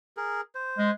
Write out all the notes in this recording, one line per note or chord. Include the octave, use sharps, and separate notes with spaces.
G#4 A#4
C5
G#3